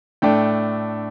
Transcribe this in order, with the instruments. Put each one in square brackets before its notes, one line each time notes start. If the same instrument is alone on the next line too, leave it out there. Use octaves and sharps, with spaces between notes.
[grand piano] A2 A3 D4 G5